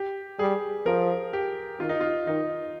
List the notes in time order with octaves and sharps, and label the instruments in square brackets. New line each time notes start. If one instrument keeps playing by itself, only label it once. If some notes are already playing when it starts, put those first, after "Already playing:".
Already playing: [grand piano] G4
[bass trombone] G3 [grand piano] G#4
[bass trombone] F3 [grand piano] A#4
[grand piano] G4
[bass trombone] D#3 [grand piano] F4
[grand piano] D#4
F4
[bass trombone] D#3 [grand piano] D#4